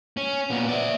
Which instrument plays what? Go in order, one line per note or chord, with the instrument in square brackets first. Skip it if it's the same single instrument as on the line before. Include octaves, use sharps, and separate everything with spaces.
[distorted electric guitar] C#4
A#2 B3
D5 E5